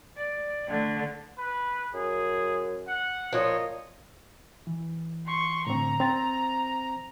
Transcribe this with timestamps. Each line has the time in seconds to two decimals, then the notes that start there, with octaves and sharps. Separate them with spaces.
0.17 D5
0.68 D3 A3
1.38 B4
1.94 F#2 G#4
2.88 F#5
3.33 A#2 F3 C#5 D#5
4.67 E3
5.26 C6 C#6
5.67 A2 D3 C4 A#5
6.00 C4 C5 A6